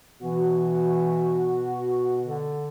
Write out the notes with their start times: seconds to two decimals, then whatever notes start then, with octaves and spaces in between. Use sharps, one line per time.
0.21 B2 E3 F#4
2.23 D3